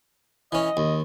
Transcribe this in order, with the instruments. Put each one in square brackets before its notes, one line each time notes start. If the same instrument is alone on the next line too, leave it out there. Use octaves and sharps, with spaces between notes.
[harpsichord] E3 C#4 [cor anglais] D#5
[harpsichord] D#2